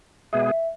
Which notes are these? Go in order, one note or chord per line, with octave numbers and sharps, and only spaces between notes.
B2 G#3 B3 G#4 E5
E5